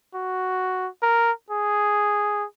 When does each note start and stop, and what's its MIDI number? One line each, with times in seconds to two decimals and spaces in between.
0.14 0.88 66
1.03 1.32 70
1.51 2.45 68